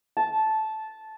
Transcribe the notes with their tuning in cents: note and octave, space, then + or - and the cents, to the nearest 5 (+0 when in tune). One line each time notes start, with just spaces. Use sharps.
A5 -10